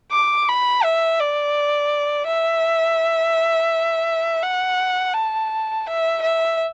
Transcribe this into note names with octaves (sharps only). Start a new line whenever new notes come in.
D6
B5
E5
D5
E5
F#5
A5
E5
E5